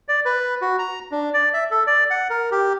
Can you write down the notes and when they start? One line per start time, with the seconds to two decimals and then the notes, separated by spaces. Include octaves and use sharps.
0.08 D5
0.25 B4
0.62 F#4
0.79 A#5
1.11 D4
1.34 D5
1.54 E5
1.71 A4
1.87 D5
2.10 F#5
2.30 A#4
2.51 G4